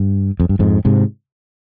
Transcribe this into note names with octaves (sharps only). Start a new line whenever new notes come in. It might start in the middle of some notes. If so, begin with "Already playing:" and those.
Already playing: G2
F2
G2
F2 G#2
G#2 C3